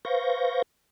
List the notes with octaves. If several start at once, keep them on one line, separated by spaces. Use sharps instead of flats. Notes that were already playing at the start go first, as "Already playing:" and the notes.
B4 C5 F5 C#6 G6 A#6